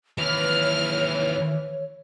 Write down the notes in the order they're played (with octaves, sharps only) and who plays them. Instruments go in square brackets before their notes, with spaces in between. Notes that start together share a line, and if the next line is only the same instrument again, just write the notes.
[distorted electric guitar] D#2 B4 [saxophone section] E3 [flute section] C#5 [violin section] F6